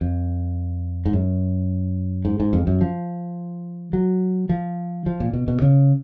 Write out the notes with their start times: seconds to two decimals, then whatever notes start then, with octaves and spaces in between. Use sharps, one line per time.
0.01 F2
1.05 G#2
1.13 F#2
2.25 G#2
2.40 G#2
2.53 F2
2.67 F#2
2.81 F3
3.93 F#3
4.49 F3
5.06 F3
5.20 A#2
5.33 B2
5.48 B2
5.62 C#3